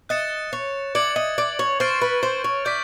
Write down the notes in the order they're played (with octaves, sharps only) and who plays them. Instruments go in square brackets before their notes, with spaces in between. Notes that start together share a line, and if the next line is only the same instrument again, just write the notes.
[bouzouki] D#5 [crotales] F#6 A6 C#7 E7
[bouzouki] C#5
[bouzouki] D5 [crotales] G#6 C#7 F#7
[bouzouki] D#5
D5
C#5
[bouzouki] C5 [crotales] C#6 F6 A6 D7
[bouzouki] B4
C5
C#5
[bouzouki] D5 [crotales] G6 B6